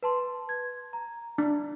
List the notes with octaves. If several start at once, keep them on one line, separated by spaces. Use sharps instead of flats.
B4 A5 C6
G#6
A#5
D4